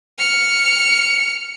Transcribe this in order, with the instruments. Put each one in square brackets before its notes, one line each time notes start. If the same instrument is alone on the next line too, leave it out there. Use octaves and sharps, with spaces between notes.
[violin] F6 C#7